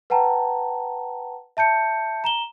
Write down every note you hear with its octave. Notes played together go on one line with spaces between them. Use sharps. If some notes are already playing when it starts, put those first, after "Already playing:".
B4 F#5 G5 A5 A#5
E5 A5 G6 C#7
A#5 E7 G7